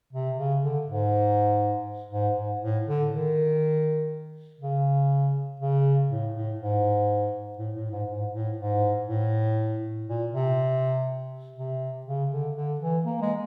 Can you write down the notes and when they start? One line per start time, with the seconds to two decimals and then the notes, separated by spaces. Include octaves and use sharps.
0.13 C3
0.37 C#3
0.62 D3
0.87 G#2
2.11 G#2
2.37 G#2
2.61 A2
2.87 D3
3.11 D#3
4.61 C#3
5.60 C#3
6.09 A2
6.34 A2
6.59 G#2
7.58 A2
7.75 A2
7.92 G#2
8.08 G#2
8.33 A2
8.58 G#2
9.08 A2
10.07 A#2
10.32 C3
11.56 C3
12.06 C#3
12.31 D3
12.56 D3
12.81 E3
13.06 A#3
13.22 G#3